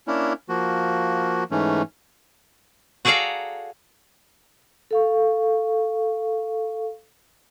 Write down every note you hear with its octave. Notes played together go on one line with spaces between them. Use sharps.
A#3 C#4 D4 E4
F3 A#3 F#4
G#2 E3 A3 C#4
F#4 G#4 A4 D5 F5 A#5
A4 F5 C#6